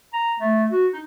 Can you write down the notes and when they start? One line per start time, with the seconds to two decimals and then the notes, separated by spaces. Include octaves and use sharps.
0.13 A#5
0.40 A3
0.70 F#4
0.93 D#4